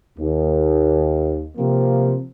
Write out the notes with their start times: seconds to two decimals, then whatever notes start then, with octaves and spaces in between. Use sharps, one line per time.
0.18 D#2
1.58 C3 F3 A#3 C4